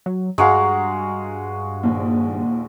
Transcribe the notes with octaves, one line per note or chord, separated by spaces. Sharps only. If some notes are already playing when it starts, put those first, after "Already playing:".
F#3
G2 G#3 F#4 F5 A#5
A#1 D#2